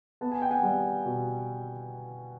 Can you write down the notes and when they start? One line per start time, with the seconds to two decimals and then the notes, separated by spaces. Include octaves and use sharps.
0.21 B3 A5
0.32 G#5
0.42 G5
0.51 F#5 G#5
0.63 G3
1.05 B2